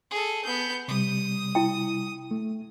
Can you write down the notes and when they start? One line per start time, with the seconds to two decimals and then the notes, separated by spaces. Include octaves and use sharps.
0.11 G#4 A4
0.44 B3 G6
0.88 C3 G3 D#6
1.55 E4 G5
2.31 A3